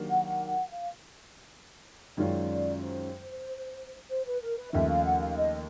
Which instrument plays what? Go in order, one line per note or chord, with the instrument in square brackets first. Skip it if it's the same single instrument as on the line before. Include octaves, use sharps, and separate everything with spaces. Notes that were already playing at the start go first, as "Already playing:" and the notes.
Already playing: [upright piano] D#3 F#3 A#3 D4 G4
[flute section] F#5
F#5
F#5
F5
[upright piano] F#2 D#3 G#3 C#4 F4 [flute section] D5
[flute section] C5
C5
B4
A#4
B4
[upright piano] D#2 C#3 F3 A3 [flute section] E5
[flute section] F5
F#5
F5
D#5